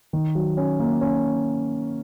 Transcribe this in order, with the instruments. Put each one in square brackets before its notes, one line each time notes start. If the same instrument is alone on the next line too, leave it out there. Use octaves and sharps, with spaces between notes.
[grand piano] D#3
F#3
C#4
A#3
C#4